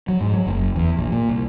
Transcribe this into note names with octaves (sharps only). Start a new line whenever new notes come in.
F#3
G#2
F#3
F#1
E2
A#1
A#2
C2